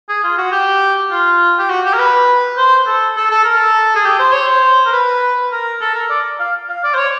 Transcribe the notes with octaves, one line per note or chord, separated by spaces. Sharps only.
G#4
F4
F#4
G4
F4
G4
F#4
G4
A#4
B4
C5
A4
A4
A4
A#4
A4
G#4
G4
C5
C#5
C5
A#4
B4
A#4
A4
A#4
D5
F5
F5
D5
C5
C#5